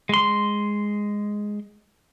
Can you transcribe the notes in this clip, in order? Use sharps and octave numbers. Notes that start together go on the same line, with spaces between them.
G#3 C6